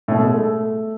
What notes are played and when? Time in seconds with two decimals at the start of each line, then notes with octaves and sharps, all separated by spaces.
0.08 A2
0.11 B2
0.18 A3
0.24 G#3
0.34 A3